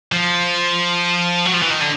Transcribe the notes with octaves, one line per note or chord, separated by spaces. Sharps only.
F3
F#3
F3
E3
D#3
D3